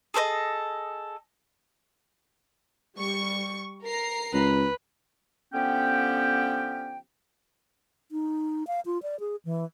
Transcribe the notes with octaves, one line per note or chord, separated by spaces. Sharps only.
G#4 A4 C5 D#5
G3 C#6
A#4 A#5 C7
C#2 B4
D3 F3 B3 C#4 G4 G5
D#4
F5
F4
D5
G#4
E3